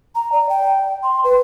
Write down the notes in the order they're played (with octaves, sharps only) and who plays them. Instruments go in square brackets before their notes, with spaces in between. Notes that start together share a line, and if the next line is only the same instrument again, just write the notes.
[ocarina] A#5
D5
G5
C6
B4